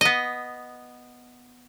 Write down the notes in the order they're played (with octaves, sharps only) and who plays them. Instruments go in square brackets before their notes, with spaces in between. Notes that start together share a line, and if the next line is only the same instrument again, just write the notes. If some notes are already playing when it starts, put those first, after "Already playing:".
[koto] B3 D#5